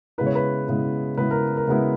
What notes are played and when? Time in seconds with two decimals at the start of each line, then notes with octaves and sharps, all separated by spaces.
0.18 C#3 G#3 B3 E4 B4
0.26 C#5
0.35 B4
0.68 C#3 G#3 B3 E4
1.18 C#3 G#3 B3 E4 B4
1.31 A#4
1.57 A#4
1.68 C#3 G#3 B3 E4